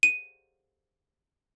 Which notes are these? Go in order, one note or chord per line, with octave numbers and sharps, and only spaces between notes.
D#7